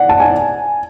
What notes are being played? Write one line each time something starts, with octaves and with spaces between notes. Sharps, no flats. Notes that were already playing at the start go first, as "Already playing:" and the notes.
Already playing: D5 F#5
A5
G#5